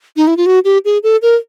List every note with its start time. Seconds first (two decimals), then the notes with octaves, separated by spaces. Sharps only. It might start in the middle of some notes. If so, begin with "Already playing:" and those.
0.17 D#4
0.27 E4
0.37 F4
0.46 F#4
0.65 G4
0.85 G#4
1.03 A4
1.22 A#4